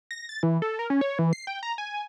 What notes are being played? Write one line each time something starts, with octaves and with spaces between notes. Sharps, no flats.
A#6
A6
E3
A4
A#4
C#4
C#5
E3
C7
G5
A#5
G#5